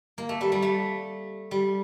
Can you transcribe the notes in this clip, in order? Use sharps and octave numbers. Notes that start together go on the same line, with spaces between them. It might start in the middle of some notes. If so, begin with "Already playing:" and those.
A#3
A3
G3
G3
A3
G3